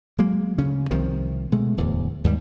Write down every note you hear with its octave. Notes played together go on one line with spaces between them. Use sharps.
F#3 G#3 A#3
D2 C#3 C#4
C2 C3 D#3 F3
B2 G#3 A3
D1 E2
D#2 G#2 G3